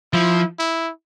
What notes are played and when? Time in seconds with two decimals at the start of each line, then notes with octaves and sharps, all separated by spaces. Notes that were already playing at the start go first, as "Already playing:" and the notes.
0.13 F3 E4
0.59 E4